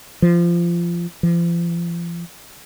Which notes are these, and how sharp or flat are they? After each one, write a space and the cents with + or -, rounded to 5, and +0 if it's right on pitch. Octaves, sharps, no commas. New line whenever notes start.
F3 -20
F3 -40